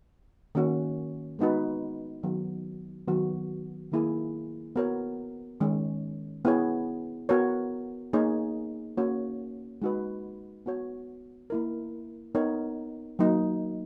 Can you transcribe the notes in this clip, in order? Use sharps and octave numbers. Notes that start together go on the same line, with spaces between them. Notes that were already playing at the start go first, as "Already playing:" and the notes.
D#3 A#3 C#4 F#4
G#3 B3 D#4 F#4 B4
D#3 F#3 B3
D#3 F#3 B3 F#4
D#3 A#3 E4 G#4
B3 F#4 A#4 C#5
D#3 G#3 C#4
B3 E4 G#4 C#5
B3 F#4 A#4 C#5
A#3 D#4 G#4 C#5
A#3 C#4 F#4 C#5
G#3 D#4 F#4 B4
B3 F#4 C#5
A#3 E4 A#4
B3 D#4 A#4 C#5
F#3 A#3 D#4